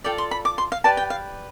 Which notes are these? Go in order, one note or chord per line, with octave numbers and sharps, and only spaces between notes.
F4 A4 D5 G5
C6
B5
D6
C6
F5
G4 B4 D5 A5
G5
F5